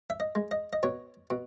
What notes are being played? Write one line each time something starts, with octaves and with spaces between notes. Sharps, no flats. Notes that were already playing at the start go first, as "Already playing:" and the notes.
E5
D#5
G#3
D#5
D#5
B2 C#5
B2